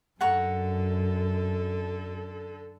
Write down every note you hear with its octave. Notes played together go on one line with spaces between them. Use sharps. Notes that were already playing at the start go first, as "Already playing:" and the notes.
F#2 D3 A4 F#5 A#5 C#6